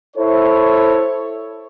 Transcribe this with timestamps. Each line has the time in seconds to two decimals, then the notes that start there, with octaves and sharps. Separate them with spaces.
0.17 E4 A4 C5 C#5